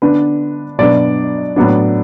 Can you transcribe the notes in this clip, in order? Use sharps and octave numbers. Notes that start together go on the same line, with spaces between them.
D3 B3 D4 B4
B2 F#3 B3 D4 D5
A2 F#3 B3 D4